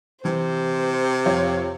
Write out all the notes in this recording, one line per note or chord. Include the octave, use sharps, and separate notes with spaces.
C3 E3 C5
F2 F4 C#5